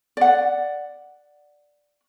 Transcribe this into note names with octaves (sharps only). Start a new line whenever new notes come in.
D5 F#5